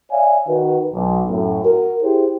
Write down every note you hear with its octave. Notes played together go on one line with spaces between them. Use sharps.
C#5 D5 E5 F5 G#5
D#3 F#4 B4
B1
F#2 A2
F#4 A#4
E4 G4 G#4 C5